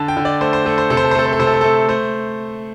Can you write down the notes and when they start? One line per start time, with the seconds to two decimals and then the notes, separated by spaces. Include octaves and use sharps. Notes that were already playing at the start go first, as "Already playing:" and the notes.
Already playing: D3 A5
0.08 G5
0.17 D3
0.25 D5
0.41 A3 C5
0.53 C5
0.66 A3 A4
0.78 C5
0.90 C3 A4
0.97 C5
1.04 A4
1.11 C5
1.15 A3 A4
1.26 C5
1.33 A4
1.39 C3 C5
1.47 A4
1.54 C5
1.61 A3 A4
1.88 A3 C5